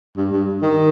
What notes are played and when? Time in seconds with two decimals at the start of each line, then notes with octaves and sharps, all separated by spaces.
0.17 G2
0.32 G2
0.63 D#3